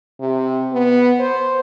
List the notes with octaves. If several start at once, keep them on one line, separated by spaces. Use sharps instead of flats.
C3
B3
C5